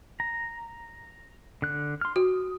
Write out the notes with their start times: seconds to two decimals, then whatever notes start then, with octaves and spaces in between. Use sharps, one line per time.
0.20 A#5
1.62 D3 F#6
2.01 C6 F6
2.16 F#4 D#6